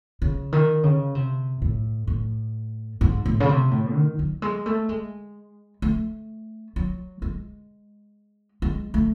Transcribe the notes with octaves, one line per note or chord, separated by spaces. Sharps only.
C#3
D#3
C#3
C3
A2
A2
G#2
A2
C#3
C3
A2
D#3
F#3
G#3
A3
G#3
A3
F#3
G#3
G#3
A3